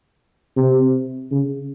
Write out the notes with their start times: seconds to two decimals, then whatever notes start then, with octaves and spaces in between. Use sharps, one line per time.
0.56 C3
1.31 C#3